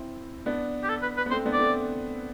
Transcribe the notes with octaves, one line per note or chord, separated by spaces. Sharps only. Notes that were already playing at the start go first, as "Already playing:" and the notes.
Already playing: C4 E4
B3 D4
G4
A4
B4
B4
B3
A3 C4 C5
B3 D4
D5
A3 C4